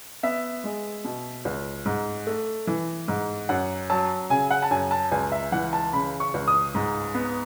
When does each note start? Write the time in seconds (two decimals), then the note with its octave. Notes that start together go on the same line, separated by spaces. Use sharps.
0.23 B3 E5
0.64 G#3
1.05 B2
1.45 C#2
1.85 G#2
2.27 A3
2.67 E3
3.08 G#2
3.49 F#2 F#5
3.90 F#3 A5
4.30 C#3 G#5
4.51 F#5
4.62 A5
4.71 F#2 G#5
4.91 A5
5.11 C#2 G#5
5.32 E5
5.52 E3 F#5
5.73 A5
5.93 C#3 B5
6.20 C#6
6.34 C#2
6.47 D#6
6.75 G#2
7.14 B3